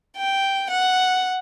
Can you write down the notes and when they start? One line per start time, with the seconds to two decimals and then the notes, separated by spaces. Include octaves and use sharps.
0.17 G5
0.70 F#5